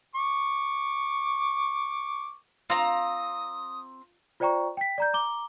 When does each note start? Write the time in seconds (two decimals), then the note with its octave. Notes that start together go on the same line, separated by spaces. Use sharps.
0.15 C#6 D6
2.70 C4 F4 A#5 D#6
4.40 F4 C5 D5 G5 A#5 C#6
4.77 G5 B6
4.98 D5 A#5 G6
5.13 A#5 D6 G7